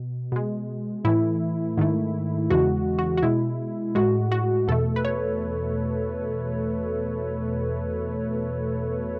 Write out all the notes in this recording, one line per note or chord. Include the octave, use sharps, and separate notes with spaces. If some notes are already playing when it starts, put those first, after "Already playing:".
Already playing: B2
B2 G#3
A2 E3 A3 E4
G#2 D#3 A3
E2 C#3 E3 G#3 F#4
F#4
F#4
B2 G#3 E4
A2 G#3 F#4
F#4
E2 B2 A3 A4
B4
C#5